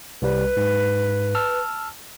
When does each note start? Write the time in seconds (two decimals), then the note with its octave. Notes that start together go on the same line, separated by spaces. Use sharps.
0.22 C2 G3 B4
0.57 G#2
1.35 A5 E6 F6